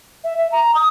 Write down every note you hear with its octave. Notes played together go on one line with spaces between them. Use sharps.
E5
E5
A#5
D#6